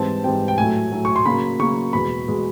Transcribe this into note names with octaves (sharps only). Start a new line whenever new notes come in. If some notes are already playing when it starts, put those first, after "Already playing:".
Already playing: G#2 E3 G3 C4 A5
G#2 E3 G3 C4 G5
G5
A2 F#3 A3 G#5
A2 F#3 A3
C#6
C6
C#3 F#3 A#3 B5
C#3 F#3 A#3 C#6
E2 B2 G#3 B5
B2 G#3